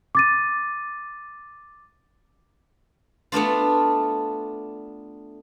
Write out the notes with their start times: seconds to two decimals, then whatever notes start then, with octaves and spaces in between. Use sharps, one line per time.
0.15 D6 A6 D#7
3.32 A3 B3 D4 F4